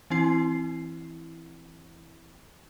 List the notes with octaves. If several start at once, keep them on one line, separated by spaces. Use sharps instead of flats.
E3 C4 E4 C7